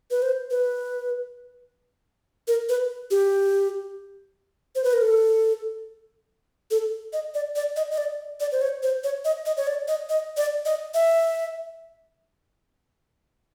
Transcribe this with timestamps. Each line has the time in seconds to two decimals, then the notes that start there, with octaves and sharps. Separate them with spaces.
0.11 B4
0.22 C5
0.51 B4
2.48 A#4
2.69 B4
3.11 G4
4.75 C5
4.84 B4
4.93 A#4
5.02 A4
6.71 A4
7.13 D#5
7.34 D5
7.56 D5
7.76 D#5
7.91 D#5
7.98 D5
8.40 D5
8.52 C5
8.61 C#5
8.83 C5
9.04 C#5
9.25 D#5
9.46 D#5
9.57 C#5
9.67 D5
9.88 D#5
10.10 D#5
10.37 D5
10.66 D#5
10.94 E5